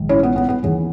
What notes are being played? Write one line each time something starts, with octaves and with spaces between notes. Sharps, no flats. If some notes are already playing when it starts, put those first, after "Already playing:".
Already playing: A#1 G#2 D#3
C#4 E4
B3
B3
B3
D#2 C#3 E3